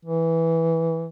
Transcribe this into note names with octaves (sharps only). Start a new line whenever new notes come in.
E3